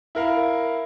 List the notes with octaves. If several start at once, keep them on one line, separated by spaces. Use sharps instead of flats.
E4 A#4 F5